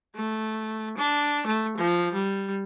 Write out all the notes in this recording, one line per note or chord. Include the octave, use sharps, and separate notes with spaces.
A3
D4
A3
F3
G3